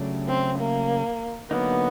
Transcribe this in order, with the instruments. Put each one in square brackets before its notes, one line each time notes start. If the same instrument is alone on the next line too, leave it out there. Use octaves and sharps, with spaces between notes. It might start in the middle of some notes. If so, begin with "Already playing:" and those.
Already playing: [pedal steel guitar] C#3 F#3 A3 D4 G4
[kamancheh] C4
A#3
[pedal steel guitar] D3 F#3 A#3 D#4 [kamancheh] B3